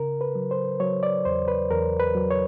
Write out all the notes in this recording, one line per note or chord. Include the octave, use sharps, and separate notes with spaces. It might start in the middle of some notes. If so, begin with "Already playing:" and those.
Already playing: C#3 A#4
B4
F#3
C5
F#3 C#5
D5
E2 C5
B4
E2 A#4
B4
F#3
C#5